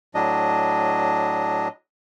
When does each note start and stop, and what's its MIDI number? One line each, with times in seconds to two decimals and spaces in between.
0.15 1.68 45
0.15 1.68 54
0.15 1.68 62
0.15 1.68 75